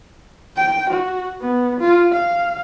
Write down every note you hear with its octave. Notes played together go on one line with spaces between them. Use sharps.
G5
F#4
B3
F4
F5